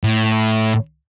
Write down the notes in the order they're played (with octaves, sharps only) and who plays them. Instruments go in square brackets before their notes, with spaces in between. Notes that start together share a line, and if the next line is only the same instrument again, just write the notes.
[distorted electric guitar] A2